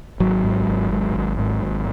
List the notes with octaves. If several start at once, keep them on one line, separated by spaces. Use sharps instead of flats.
G#1 F#3
G#2
G#1
G#2
G#1
G#2
G#1